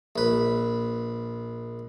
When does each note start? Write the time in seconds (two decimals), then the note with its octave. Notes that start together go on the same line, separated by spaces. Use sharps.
0.16 A#1 B4